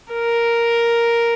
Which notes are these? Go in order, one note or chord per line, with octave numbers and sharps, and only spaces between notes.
A#4